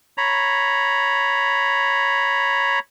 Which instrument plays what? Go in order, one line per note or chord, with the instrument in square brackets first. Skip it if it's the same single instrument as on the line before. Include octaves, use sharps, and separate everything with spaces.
[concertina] C#5 A#5 B5